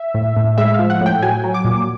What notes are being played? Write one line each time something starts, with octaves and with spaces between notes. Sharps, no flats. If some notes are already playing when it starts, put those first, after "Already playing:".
Already playing: E5
A2
A2
G#3 E5
F3 F5
F#5
A2 G5
F#3 G#5
F#3
D6
A#2